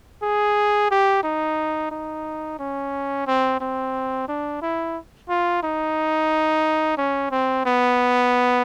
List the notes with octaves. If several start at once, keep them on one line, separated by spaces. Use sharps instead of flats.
G#4
G4
D#4
D#4
C#4
C4
C4
D4
E4
F4
D#4
C#4
C4
B3